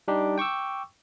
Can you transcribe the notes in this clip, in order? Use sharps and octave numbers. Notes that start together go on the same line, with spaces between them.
G3 D4 D#4 G4
G5 C#6 D6 E6